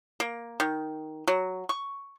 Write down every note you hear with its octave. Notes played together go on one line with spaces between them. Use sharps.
A#3
D#3
F#3
C#6